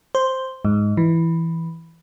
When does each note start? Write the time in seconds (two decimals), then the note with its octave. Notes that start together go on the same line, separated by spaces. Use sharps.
0.15 C5
0.65 G#2
0.97 E3